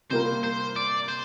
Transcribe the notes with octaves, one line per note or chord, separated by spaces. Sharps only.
C3 G3 A#3 F4 A#4 C5
C5
D5
C5